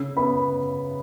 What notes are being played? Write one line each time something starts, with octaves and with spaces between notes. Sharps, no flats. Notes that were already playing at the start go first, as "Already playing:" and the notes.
Already playing: C#3
B3 B5